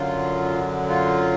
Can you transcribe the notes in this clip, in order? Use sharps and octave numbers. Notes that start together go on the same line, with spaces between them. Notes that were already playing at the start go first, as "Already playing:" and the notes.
Already playing: F#2 D3 F#3 F4
F4